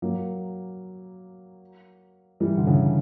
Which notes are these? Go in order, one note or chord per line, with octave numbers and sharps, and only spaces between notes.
F#3 A#3
E3 G3
D3
C#3 E3